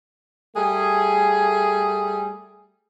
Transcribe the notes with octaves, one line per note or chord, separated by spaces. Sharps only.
G3 A3 G#4